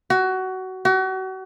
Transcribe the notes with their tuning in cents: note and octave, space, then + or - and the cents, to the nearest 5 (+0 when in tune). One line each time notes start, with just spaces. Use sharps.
F#4 +20
F#4 +35